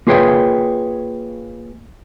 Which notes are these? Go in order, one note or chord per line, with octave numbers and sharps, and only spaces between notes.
A#3 F4 G#4 B4 C#5 G5